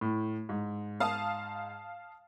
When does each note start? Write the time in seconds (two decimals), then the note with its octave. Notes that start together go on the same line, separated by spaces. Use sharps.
0.01 A2
0.49 G#2
1.00 F5 A5 D#6